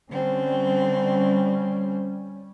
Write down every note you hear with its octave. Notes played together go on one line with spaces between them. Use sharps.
D3 G3 C4 C#4